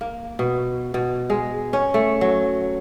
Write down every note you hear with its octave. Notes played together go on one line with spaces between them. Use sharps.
A#3
B2
B2
G#3
C#4
A3
F#3